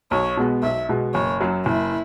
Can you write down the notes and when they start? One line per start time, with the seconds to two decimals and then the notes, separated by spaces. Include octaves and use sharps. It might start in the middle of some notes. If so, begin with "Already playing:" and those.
0.11 B1 C#5
0.37 B2 G#3 B3
0.63 B1 E5
0.89 B2 G#3 B3
1.15 F#1 C#5
1.40 F#2 F#3
1.66 F#1 E4